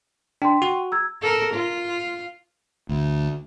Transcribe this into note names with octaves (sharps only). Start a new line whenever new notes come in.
D4 G5 C6
F#4
A#5 E6 G#6
A4 A#4
F4
D2